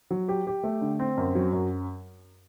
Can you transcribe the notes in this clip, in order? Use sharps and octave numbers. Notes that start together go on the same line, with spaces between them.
F#3
G4
G4
A3
D3
C4
F#2
F#3
F#2